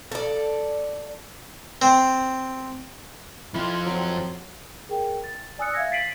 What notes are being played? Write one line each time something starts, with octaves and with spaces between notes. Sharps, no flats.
A4 D5
C4
F2 F3 E4 F4
F#3 C4
G#4 A#4 G5
A6
D5 G#5 D#6 E6 F#6 C#7
E5 F5 G#6 A#6
A6 B6 C7 D7 D#7 F#7